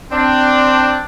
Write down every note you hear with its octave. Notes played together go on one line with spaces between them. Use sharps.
C4 D4